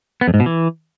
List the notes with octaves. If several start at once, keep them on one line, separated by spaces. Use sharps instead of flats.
B3
F2
G#2
B2
E3